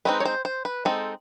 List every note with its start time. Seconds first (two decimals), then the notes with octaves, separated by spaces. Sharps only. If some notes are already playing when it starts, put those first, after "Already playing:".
0.05 G#3 C4 D#4 B4
0.20 C#5
0.25 C5
0.45 C5
0.65 B4
0.85 G#3 C4 D#4 A4